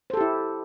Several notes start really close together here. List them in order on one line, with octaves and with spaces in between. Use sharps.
C5 A4 G4 E4